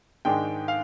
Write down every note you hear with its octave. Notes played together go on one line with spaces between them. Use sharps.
G#2 D#3 G#3 D4 G5
F5